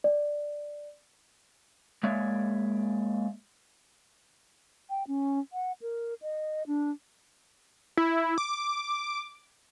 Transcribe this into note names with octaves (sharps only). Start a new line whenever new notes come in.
D5
G#3 A#3 C#5 D5 E5
G5
C#4
F#5
A#4
D#5
D4
E4
D6